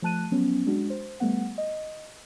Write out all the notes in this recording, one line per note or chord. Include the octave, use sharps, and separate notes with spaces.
F3 A3 A5 F#6 D#7
F3 F#3 B3 C#4
G#3 D4 F#4
C5
G3 A3 B3 F#5
D#5